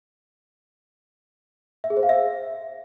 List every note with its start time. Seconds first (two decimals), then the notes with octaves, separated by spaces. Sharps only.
1.84 E5
1.90 G#4
1.97 C5
2.03 F5
2.09 E5